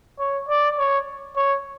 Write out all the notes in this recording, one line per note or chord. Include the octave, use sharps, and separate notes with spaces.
C#5
D5
C#5
C#5